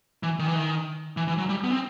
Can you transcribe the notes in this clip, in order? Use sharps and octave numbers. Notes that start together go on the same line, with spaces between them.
E3
D#3
E3
D#3
E3
E3
F#3
G3
B3
C4